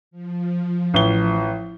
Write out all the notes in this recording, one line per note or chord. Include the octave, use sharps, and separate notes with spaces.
F3
A1 G7